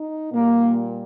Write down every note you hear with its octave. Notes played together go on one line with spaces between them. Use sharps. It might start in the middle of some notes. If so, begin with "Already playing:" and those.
Already playing: D#4
A#2 G3 A#3